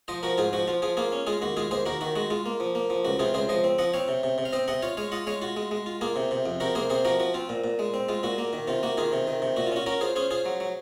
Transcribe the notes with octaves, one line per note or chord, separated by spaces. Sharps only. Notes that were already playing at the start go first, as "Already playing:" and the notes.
F3 C5 D#5
F3 F#4 A#4
G#2 F4 G#4
F3 F#4
F3 F4
F3 F4 G#4
A#3 F4 G#4
C#4
G#3 F4 G#4
D#2 F#4
G#3 F4 G#4
D#2 G#4 C5
D#2 F#4 A#4
D#3 F#4
G#3 F#4
G#3 F4
A#3
F3
A#3
F3
C#2 F#4
C3 F4 G#4
C#2 G#4 C5
F3 C5 D#5
C4
F3 D#5 F#5
C4 C#5 F5
C3
C3
C3
F5
C4 C5 D#5
C3 D#5 F#5
F4 C#5 F5
G#3 C#5 F5
F4 D#5 F#5
G#3 C#5 F5
F4 F#4
G#3
G#3
F4
A#3 F4 G#4
C3
C3
F2
C3 F#4 A#4
A#3 G#4 C5
C3 G#4 C5
F3 F#4 A#4
F3 F#4
C4 F4
A#2
A#2
G#3
C4
G#3 F4
A#2 F#4
A#3
D#3
C3 F4
A#3 F#4
D#3 F4 G#4
C3
D#3
C3
A#2 F#4
F4
C#4 F#4
C#4 F#4 A#4
F4 G#4 C5
C#4 G#4 C5
F4 G#4 C5
F#3
F#3